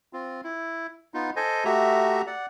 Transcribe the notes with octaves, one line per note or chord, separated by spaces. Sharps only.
C4 F4
E4
B3 D#4 F4
A4 C5 D#5 G#5
A3 F#4 G4 E5 A#5
D5 F#5